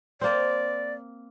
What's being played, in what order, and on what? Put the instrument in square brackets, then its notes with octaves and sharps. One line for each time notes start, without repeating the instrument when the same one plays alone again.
[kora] A#3 C4 [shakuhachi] D5